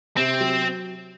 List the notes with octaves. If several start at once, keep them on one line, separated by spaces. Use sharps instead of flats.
C3 C4
F#3